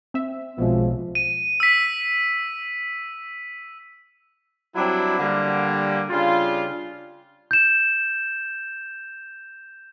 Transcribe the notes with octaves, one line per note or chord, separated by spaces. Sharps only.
C4 E5
B1 B2 F3 G#3
D#7
E6 B6
F#3 G3 C4 D4 E4
D3 G3 A#3
C#3 G3 D4 F4
G6 E7